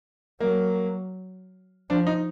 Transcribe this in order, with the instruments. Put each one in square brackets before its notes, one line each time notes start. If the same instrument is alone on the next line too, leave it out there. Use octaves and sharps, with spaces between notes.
[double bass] F#3 [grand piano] A#3
[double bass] F3 [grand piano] D4
[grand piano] D#4